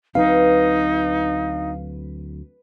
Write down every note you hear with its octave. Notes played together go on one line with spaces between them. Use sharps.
D2 F#3 C4 D#4 B4 F5